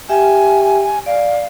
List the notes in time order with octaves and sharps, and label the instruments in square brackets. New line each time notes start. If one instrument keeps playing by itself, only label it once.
[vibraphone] G4 E5 G5 [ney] G#5
[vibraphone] D5 [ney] F5